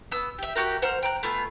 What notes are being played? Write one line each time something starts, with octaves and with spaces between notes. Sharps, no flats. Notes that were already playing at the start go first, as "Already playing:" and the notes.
B3 E6
G4 E5
F#4 G4 A#4
C5 F#5 A#5 F6
G5 A#5 F#6
A3 B3 F4 G#5